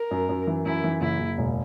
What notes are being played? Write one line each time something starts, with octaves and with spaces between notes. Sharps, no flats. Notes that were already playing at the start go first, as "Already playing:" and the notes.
Already playing: A#4
F#2
F#2
E3
F#2 E4
E3
F#1 E4
F#1
E1